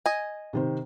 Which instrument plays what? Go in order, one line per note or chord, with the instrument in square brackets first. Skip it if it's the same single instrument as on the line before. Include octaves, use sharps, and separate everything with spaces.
[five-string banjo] D#5 G#5
[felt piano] C3 D#3 C5